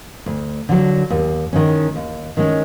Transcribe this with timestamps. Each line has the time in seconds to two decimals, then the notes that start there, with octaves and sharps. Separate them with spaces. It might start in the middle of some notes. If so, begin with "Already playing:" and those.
0.26 D2
0.69 D3 F#3
1.10 D#2
1.53 D#3 G#3 C#4
1.96 D#2
2.37 D#3 G#3 C#4